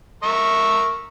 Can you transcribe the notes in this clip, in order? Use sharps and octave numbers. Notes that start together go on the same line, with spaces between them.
A#4 E5 C#6